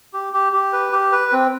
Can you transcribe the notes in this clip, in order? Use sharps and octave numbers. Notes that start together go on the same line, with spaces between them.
G4
G4
G4
B4
G4
B4
C4